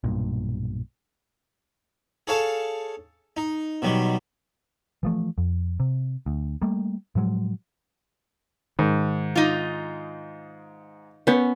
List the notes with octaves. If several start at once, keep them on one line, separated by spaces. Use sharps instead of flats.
B1 G2 A#2
G#4 A4 C#5 F5 A5
D#4
B2 D#3 F#3 G3
E3 F3 A3
F2
C3
D2
G3 A3 A#3
A2 F3 F#3 G#3
G#2 D#3
D#4 F4
B3 C#4